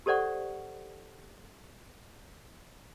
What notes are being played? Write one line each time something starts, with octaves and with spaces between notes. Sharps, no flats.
G4 A4 C5 D5 F#5 C#6